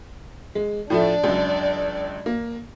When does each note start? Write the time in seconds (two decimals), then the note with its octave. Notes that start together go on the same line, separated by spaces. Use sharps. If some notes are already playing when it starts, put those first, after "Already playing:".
0.55 G#3
0.90 A2 F3 A3 D4 D5
1.24 C#2 F#2
2.26 A#3